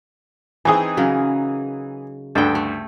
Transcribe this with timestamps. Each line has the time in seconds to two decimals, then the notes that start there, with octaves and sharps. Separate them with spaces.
0.65 E3 C4 D#4 G#4
0.97 C#3 F#3 A#4
2.35 D2 G2 A4 G5
2.55 A3